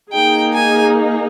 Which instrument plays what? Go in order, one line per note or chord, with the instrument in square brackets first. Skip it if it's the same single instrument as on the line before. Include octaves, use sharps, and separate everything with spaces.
[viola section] A#3 D#4 G#4 [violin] G5
[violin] G#5